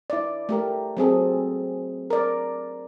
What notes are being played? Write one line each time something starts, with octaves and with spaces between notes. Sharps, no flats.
E4 D5
A3 G4 A#4
F#3 C4 G#4 A4
A#4 D5